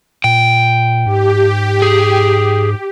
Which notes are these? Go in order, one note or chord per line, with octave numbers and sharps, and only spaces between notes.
A#2 G5
G#2 G4
G#4